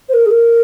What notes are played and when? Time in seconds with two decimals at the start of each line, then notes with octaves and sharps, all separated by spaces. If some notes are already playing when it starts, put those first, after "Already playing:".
0.09 C5
0.13 A#4
0.26 G#4
0.30 A#4